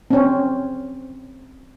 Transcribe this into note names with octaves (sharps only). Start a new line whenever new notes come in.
C4 C#4